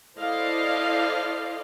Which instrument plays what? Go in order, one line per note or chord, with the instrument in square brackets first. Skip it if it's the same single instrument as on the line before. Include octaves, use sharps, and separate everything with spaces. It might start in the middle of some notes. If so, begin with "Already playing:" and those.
[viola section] E4 A4 C5 D5 D#5 F5